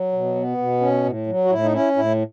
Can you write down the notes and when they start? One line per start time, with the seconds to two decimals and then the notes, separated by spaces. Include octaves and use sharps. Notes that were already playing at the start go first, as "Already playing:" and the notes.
Already playing: F#3
0.12 B2
0.35 B3
0.58 B2
0.81 C#4
1.04 A2
1.27 F#3
1.45 F#4
1.50 A2 E4
1.63 D#4
1.73 C#4 E4
1.96 A2 E4